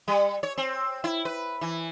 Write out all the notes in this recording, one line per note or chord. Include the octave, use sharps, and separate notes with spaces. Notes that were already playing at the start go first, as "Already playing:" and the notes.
G3
C#5
C4
E4
B4
E3